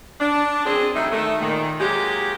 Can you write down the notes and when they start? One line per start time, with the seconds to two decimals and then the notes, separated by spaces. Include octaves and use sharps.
0.20 D4
0.65 F#2 C4 C#4 G#4
0.95 C3 F#3 G3 A3 D#4 E5
1.11 D#3 A3
1.41 A#2 D#3
1.80 F#3 G#3 A#3 G4